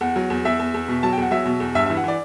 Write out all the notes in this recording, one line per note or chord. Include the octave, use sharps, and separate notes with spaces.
E2 F#5
F#3
E2
E2 E5
E2
E2
B2
F#3 A5
G5
E2 F#5
F#3 E5
B2
E2
G2 E5
E5
E3
F#5
E3 D5